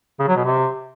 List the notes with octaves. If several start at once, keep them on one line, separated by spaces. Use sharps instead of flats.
C#3
F#3
B2
C3